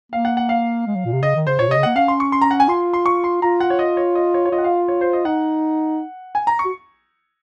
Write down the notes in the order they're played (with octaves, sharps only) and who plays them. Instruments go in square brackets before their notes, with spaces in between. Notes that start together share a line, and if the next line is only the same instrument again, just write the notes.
[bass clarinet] A#3 [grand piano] F5
[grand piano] F#5
F#5
F5
[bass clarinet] G#3
F#3
A#2
C3
[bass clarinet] C#3 [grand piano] D#5
[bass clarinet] D#3
[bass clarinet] C#3 [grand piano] C5
[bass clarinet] A#2 [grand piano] C#5
[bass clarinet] C3 [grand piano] D#5
[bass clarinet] C#3
[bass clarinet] A#3 [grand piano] F#5
[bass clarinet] C#4 [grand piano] F5
[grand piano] C6
C#6
C6
A#5
F#5
G#5
[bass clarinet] F4 [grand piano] C6
[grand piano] C6
C#6
C6
[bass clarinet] F4 [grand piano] A#5
[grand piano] F#5
C#5
D#5
C#5
D#5
C#5
C#5
[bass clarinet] F4 [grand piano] D#5
[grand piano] F#5
F5
C#5
C5
D#5
[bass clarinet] D#4 [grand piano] F#5
[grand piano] G#5
A#5
C#6
[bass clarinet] F#4